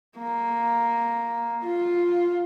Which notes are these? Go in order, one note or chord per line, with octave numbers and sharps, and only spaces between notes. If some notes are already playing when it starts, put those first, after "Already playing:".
A#3
F4